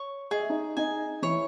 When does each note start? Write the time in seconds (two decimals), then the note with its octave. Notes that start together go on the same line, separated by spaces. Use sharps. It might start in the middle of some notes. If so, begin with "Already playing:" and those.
Already playing: C#5 C#6
0.31 G#4 D#5
0.40 E5
0.49 D#4 D#5
0.77 D#4 D#5 G#5
1.22 E3 E4 C#5